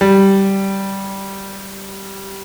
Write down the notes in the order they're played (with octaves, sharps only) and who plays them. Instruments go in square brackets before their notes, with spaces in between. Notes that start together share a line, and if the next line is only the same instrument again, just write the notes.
[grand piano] G3